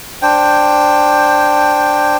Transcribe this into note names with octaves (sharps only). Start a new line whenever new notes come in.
D4 C5 G5